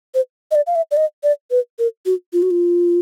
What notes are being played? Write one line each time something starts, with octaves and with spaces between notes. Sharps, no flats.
C5
D#5
D5
F5
E5
D5
D#5
D5
B4
A#4
F#4
F4
F#4
F4